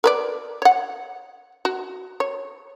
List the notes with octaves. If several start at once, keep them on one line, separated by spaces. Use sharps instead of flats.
A#4 B4 D5
C#5 F#5
F#4
C#5